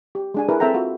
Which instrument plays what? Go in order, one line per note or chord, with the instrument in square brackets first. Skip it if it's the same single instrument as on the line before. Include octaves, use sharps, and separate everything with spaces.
[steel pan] G4
G#3 D4 G#5
E4 G#4 A#4 B4
C4 A4 E5 G5 A#5
F4 F#4